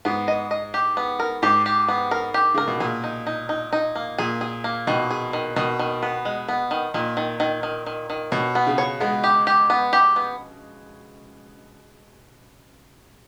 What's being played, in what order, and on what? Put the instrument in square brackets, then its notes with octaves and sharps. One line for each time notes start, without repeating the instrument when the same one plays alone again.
[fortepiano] G#2 [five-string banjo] B3
[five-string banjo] D#5
D#5
G4
B3
A#4
[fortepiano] G#2 [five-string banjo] G4
[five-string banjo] G4
B3
A#4
G4
[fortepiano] C#3 [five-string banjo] A#4
[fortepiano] B2
[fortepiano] A#2 [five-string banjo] G#4
[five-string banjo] D#4
D#4
D#4
D#4
A#3
[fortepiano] A#2 [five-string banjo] G#4
[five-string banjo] G#4
A#3
[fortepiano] B2 [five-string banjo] D#3
[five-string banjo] G#4
D#3
[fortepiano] B2 [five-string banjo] D#3
[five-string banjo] D#3
B3
G#3
B3
D#3
[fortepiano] A#2 [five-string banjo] D#3
[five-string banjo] D#3
D#3
D#3
D#3
D#3
[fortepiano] B2 [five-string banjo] C#5
[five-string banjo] B3
[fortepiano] C#3
[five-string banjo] C#5
[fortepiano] G#3 [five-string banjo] B3
[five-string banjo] G4
G4
B3
G4
B3